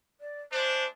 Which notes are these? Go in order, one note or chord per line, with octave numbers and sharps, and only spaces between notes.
D5
G#3 A3 D4 C5